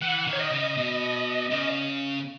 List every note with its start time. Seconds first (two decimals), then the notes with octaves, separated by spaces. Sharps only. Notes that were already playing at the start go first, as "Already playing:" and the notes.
0.01 E3 F#5
0.27 D#3
0.33 C#5
0.39 D#5
0.51 C#3
0.77 B2
1.50 C#3